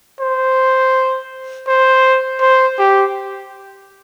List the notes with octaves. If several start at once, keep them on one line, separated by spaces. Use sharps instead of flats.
C5
C5
C5
G4